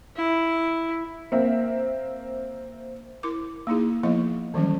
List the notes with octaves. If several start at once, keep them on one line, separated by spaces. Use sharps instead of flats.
E4
A#3 C4 E5
E4 A#4 D6
A#3 D#4 E4 G#4
F3 A#3 B3 E4 D#5
D#3 E3 F#3 G3 C#4